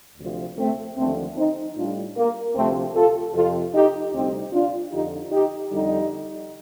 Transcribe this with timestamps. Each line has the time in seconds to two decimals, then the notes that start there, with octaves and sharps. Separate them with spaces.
0.18 D2 C3 F3
0.58 A3 C4
0.98 D#2 D3 F3 A3 C4
1.37 C4 D#4
1.76 A2 G3 D4 F4
2.17 A#3
2.56 D2 C3 F3 A3 C4
2.95 F4 A4
3.34 F2 C3 F3 F4 A4
3.74 D#4 G4
4.13 D2 C3 G3 C4 D#4
4.54 D4 F4
4.92 F2 D3 F3 D#4 G4
5.32 D#4 G4
5.71 F2 D3 G3 D#4 G4